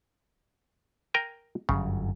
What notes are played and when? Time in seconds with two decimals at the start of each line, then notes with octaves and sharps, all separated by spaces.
1.14 A#4 G5 G#5
1.69 G1 F#2 C#3 F#3